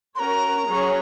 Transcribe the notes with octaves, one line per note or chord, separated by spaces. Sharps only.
C#4 F#4 A#4 C#5 A#5 C6
F#3 C#4 G#4 C#5